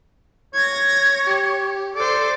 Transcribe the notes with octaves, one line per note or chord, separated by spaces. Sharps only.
C#5 G#6 A#6
G4
A4 C5 D5